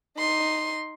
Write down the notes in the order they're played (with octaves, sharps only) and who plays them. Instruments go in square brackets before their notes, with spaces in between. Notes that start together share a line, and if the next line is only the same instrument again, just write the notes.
[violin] D#4 C6